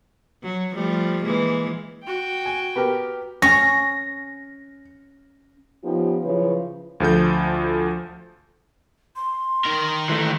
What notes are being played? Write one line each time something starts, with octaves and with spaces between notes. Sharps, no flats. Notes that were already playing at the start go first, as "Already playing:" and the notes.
F#3
F3 G3 A3
E3 G#3 A#3
F#4 G5
G#5
B3 G4 A#4
C#4 A#6
F3 B3 C#4 D#4 F4 G4
C#3 F3 F#3 E4 B4 C#5
D2 F3 A4 G6
C6
D#3 A#4
E3 A3